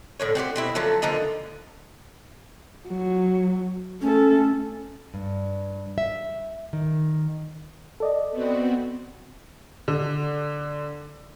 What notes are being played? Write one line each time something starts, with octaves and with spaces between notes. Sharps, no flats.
A2 D3 C#5
C4 F#4 G4 C5
B2 C4 E4
D3 F3 F#3 A3
D3 F3 A#3 D#4
F#3
A3 C#4 A4
G2
E5
D#3
A4 D5 D#5
B3 C4 F#4
D3